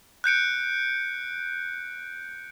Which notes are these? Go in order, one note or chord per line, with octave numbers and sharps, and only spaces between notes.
F#6 G6 C#7 D7